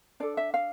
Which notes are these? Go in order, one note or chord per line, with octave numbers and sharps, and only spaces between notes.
D4 A4 D5
E5
F5